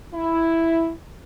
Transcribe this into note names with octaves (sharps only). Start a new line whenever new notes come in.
E4